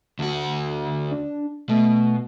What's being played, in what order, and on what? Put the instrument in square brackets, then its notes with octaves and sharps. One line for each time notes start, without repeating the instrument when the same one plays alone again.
[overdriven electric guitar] D2 F#4
[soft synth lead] D4
[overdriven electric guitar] B2 [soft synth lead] A3